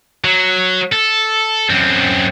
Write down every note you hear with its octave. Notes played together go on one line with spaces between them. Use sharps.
F#3
A4
F#2 C4